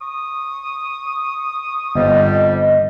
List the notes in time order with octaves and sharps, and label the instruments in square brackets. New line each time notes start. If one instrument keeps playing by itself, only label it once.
[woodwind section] C#6 D#6
[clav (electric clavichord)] G1 [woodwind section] F2 G3 [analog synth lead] D#5